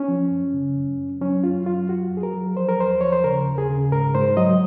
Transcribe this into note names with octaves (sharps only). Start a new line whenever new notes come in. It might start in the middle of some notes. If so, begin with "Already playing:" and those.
Already playing: C#4
F3
F#2
C#3
F#2
F#2
F#3 C#4
F#2 F4
F#3 F4
F#2 F#4
F#2
G#4
A#4
F#3
F3 C5
A#4
D#2 C5
F3 C#5
C5
C#3 A#4
D#2
G#4
C#3
G#2 A#4
G#2 C5
F#3 D#5